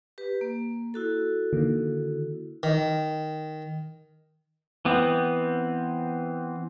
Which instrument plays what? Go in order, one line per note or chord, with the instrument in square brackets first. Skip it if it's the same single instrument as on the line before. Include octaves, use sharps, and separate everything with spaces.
[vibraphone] G4 B4
A#3
E4 F#4 A4
[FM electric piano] D3 D#3 A#3
[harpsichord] D#3
[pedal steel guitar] E3 B3 C4